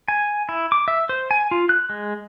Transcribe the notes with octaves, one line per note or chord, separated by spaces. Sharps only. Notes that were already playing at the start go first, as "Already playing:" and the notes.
G#5
E4
D6
E5
C5
G#5
F4
F#6
G#3